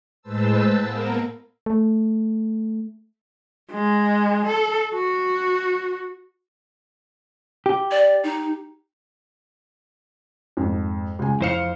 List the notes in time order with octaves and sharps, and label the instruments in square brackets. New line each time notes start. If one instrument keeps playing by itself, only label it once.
[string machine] A2 G#3 B4 C5 A5 E6
A#3 B3 A#4
[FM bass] A3
[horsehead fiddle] G#3
A4
F#4
[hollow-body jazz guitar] G4
[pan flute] D5
D#4
[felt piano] F2 G#2
C#2 G#5
[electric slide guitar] F2 C5 F5 [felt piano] E3 C#7